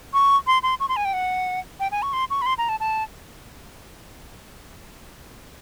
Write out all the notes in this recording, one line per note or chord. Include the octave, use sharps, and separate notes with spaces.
C#6
C6
C6
C#6
C6
G#5
G5
F#5
G5
G#5
C#6
C6
C#6
B5
C6
A#5
A5
A5